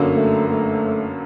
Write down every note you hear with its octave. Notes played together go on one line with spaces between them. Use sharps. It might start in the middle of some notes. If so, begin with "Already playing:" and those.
Already playing: G1 F#2 D3 F#3 A#3
A3
A3